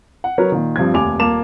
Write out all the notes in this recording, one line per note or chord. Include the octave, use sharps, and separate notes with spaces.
F#5
F#3 A#4 B4 C#5
A#2 D#3
G2 F3 C4 G#6
F1 D#2 G#5 D6 F7
D#1 A#3 A5 D6 E7 F7